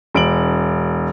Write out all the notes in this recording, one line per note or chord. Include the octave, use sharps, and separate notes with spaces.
E1 D7 F#7